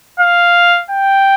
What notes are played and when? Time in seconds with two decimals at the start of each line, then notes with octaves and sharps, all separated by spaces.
0.20 F5
0.91 G5